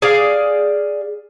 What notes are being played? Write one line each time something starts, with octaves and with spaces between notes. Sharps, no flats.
G#4 D5 F5